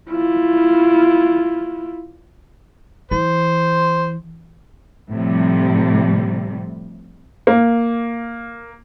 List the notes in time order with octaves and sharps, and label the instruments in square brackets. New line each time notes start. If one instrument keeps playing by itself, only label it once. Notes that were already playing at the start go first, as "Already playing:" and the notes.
[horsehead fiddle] E4 F4
[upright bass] E3 [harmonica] C5
[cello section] A2 C3 F3 G3
[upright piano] A#3